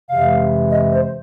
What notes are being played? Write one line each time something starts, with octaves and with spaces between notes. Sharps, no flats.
F2 C3 E3 G#3 F5
D#5
C5